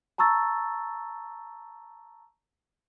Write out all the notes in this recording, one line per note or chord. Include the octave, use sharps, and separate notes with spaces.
A5 A#5 C#6 E6 A6